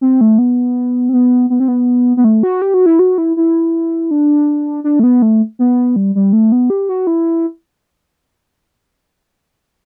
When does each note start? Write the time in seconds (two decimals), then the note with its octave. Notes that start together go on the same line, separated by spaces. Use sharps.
0.01 C4
0.21 A3
0.38 B3
1.09 C4
1.13 B3
1.50 B3
1.60 C4
1.68 B3
2.17 B3
2.24 A3
2.43 F#4
2.62 G4
2.74 F#4
2.86 E4
2.99 F#4
3.18 E4
3.37 E4
4.11 D4
4.84 D4
4.99 A3
5.03 B3
5.22 A3
5.59 B3
5.96 G3
6.15 G3
6.33 A3
6.52 B3
6.70 G4
6.89 F#4
7.07 E4